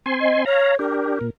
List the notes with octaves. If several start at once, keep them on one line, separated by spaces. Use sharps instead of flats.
C4 G#5 C6
D#5
C#5 F5 A#5
D4 G4 A#4
A#2